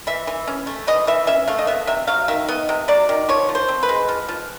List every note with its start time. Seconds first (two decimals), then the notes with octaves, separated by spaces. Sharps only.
0.07 E3 E5
0.27 E3
0.47 C#4
0.67 A3
0.87 E3 D#5
1.07 E3 E5
1.27 C#4 E5
1.48 A3 F5
1.59 D#5
1.67 B3 E5
1.87 C3 E5
2.07 F#3 F5
2.28 D#3 E5
2.48 B3 D#5
2.69 C3
2.88 F#3 D5
3.09 D#3
3.29 F3 C#5
3.49 F3
3.55 C5
3.68 C4
3.83 B4
3.89 G#3
4.09 F3
4.29 F3